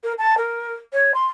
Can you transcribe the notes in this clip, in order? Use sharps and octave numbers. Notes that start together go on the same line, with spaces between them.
A#4
A5
A#4
C#5
C6